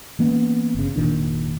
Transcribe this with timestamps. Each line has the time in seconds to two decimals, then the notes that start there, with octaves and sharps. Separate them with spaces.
0.19 E3 A#3 B3 C#4
0.75 G1 C#3
0.96 F1 A#2 D#3 D4